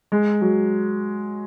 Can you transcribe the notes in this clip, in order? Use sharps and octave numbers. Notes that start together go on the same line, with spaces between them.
G#3
F#3